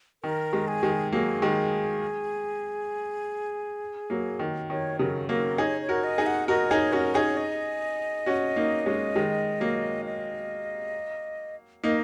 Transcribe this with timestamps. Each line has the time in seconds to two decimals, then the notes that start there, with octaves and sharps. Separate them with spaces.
0.24 D#3 A#4
0.53 D#3 G#3
0.68 G#4
0.83 D#3 G#3
1.12 F#3 A#3 G#4
1.42 D#3 G#3
4.10 F#3 A#3
4.39 D#3
4.70 D#3 C#5
4.99 C#3 F#3 A#4
5.29 F#3 A#3 A#4
5.58 D#4 G#4 C#5
5.81 C#5
5.89 F#4 A#4
6.04 D#5
6.18 D#4 G#4
6.26 F#5
6.48 F#4 A#4 D#5
6.70 D#4 G#4 C#5
6.93 C#4 F#4 A#4
7.14 D#4 G#4 C#5
7.37 D#5
8.26 C#4 F#4
8.56 A#3 D#4
8.86 G#3 C#4
9.16 D#3 G#3
9.60 F#3 A#3
10.05 D#5
11.83 A#3 D#4 D#5